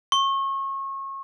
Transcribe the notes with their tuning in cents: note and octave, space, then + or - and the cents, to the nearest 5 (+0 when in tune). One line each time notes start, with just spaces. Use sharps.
C#6 -30